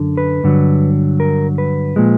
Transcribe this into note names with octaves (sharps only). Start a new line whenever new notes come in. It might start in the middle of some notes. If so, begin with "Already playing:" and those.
Already playing: F#2 D3
B4
G2 D3 F#3
A#4
B4
A#2 F3 G#3